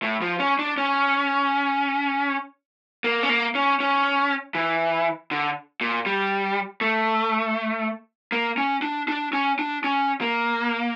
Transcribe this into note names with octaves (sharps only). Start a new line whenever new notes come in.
A2
F3
C#4
D4
C#4
A#3
C#4
A#3
C#4
C#4
E3
D3
A#2
G3
A3
A#3
C#4
D4
D4
C#4
D4
C#4
A#3